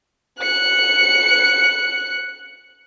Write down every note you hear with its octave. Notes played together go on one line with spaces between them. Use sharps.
F#6 C#7